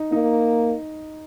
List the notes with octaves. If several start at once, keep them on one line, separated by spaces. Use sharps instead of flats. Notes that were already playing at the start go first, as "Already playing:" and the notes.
Already playing: D#4
A#3 D#4